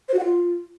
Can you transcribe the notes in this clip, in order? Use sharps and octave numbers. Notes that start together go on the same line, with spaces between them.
C5
F#4
F#5
F4